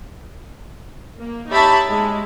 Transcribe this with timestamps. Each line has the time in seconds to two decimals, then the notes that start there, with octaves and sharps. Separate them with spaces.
1.18 A#3
1.49 D#4 G4 C#5 E5 A5 B5
1.89 G#3